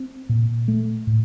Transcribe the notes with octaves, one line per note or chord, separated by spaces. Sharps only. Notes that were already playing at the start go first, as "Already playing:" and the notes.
Already playing: C4
A#2
A3
A2